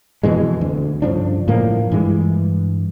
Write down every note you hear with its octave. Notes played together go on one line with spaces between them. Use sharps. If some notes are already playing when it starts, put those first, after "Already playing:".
F2 B2 E3 G#3
D2
G2 C#3 F3 D4
A2 F3 A#3
G2 E3 G#3